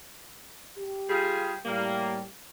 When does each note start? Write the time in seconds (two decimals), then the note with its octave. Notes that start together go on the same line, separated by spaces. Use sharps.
0.77 G4
1.10 G3 F4 G#4
1.65 A2 G3 A#3